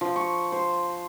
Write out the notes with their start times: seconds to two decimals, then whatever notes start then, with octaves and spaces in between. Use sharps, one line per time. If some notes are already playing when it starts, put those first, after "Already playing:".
0.01 F3
0.16 C#6
0.52 C5